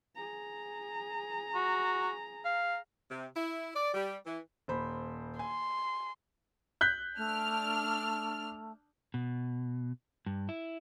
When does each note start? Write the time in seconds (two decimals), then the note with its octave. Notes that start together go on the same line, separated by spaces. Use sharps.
0.16 G#4 A#5
1.55 F#4
2.45 F5
3.11 C3
3.35 E4
3.75 D5
3.94 G3
4.26 E3
4.68 D#1 C5 B5
5.39 G#5 C6
6.81 F#6 G6 B6
7.17 A3 D4 F6
9.14 B2
10.26 G2
10.49 E4